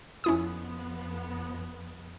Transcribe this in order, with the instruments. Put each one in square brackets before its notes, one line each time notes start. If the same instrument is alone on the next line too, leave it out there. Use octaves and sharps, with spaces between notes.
[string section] F2 F3 B3 [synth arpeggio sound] C#4 E4 D#6